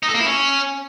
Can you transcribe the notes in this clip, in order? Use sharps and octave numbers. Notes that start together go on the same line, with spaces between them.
D#4
A4
A#3
E4
C#4